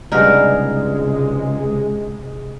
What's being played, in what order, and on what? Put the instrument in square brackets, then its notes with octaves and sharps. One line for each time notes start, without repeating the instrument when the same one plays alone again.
[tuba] C#2 [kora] G2 B3 D#4 [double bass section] C3 G#3 [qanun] G#4 A#4